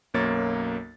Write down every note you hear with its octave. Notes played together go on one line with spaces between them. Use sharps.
B1 F#2 A#3 C#5 A6